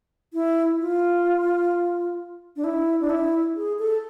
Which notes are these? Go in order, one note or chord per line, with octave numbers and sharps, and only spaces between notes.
E4
F4
D4
E4
D4
E4
G#4
A4